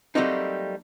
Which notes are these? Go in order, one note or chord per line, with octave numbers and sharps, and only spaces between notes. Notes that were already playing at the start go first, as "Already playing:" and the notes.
F#3 G3 A3 A#3 C4 D#4